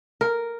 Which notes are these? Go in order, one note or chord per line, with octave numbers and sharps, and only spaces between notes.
A#4